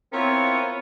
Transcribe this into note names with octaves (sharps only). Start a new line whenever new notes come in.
B3 C4 E4 F4 A#4 C#5